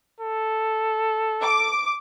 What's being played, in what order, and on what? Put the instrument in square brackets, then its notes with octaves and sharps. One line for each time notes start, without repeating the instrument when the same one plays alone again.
[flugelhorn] A4
[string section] D6